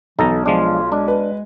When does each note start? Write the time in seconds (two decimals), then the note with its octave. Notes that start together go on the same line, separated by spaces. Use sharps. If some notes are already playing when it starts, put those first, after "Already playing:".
0.19 B1 E3 D#4 A4 A#5
0.46 F3 G#3 D4 F4
0.92 G#3 D4
1.08 B4